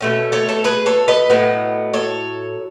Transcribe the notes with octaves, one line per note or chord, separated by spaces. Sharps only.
B2 A3 C#4
A4 C#5
A4 C#5
G#4 B4
A4 C#5
B4 D#5
A2 F#3 B3
A4 C#5